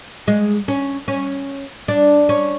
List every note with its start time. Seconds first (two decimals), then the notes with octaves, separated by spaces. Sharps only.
0.28 G#3
0.68 C#4
1.08 C#4
1.88 D4
2.29 C#4